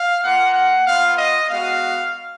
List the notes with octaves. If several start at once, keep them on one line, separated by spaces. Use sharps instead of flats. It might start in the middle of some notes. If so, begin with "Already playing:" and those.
Already playing: F5
A#3 F4 F#5
F#5
B3 F4 F5
D#5
G#3 B3 F#4 F5